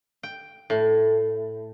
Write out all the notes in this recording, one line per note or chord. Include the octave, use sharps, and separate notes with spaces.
G5
A2